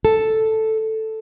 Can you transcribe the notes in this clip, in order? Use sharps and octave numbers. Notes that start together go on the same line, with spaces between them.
A4